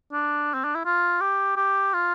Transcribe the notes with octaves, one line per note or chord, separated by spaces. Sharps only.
D4
C4
D4
E4
F4
G4
G4
F4